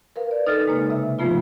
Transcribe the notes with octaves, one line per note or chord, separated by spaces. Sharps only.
A#4 B4 F5
D5
D#4 A4 B4 D#5 F6 A6
C#3 G#3 A#3 D#4
C3 E5
G#2 C3 F3 A3 B3 F4